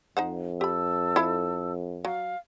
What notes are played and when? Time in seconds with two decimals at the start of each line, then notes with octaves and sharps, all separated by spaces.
0.17 F2 D#4 C5 F#5
0.61 G4 A5 B5 E6
1.16 E4 A4
2.05 F#3 F5